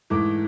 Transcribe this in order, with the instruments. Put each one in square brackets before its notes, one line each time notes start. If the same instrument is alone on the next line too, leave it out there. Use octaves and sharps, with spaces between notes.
[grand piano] G#2 E3 A3 D6